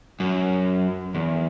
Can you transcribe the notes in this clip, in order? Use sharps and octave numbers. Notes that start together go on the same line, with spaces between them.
F#2
E2